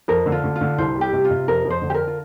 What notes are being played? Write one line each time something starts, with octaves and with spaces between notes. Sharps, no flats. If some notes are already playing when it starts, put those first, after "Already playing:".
F2 A#4
D3
F4
D3
F4
D3
C2 C5
G3
G4
C3
F4
C3
F2 A#4
F2
C5
D3
G4
A#4
F4